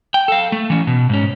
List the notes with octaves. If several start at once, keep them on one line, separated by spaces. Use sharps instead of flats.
G5
A4 F5
A3
E3 C#4
B2
G#2 C#4